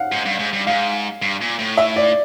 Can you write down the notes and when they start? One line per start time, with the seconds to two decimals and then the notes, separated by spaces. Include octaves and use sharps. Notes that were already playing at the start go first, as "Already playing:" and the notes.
Already playing: F5 F#5
0.12 G#2
0.25 G2
0.39 G#2
0.53 G2
0.67 G#2 F5
1.22 G2
1.42 A#2
1.59 A2
1.77 E5
1.96 D5